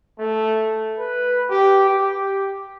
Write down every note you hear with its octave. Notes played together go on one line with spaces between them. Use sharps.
A3
B4
G4
G4